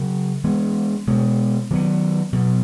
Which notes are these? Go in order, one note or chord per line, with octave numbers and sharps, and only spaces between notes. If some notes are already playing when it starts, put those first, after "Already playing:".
Already playing: C#3 F#3 B3
E3 G#3 B3
B2 G#3 B3
D#3 F#3 B3
B2 F#3 B3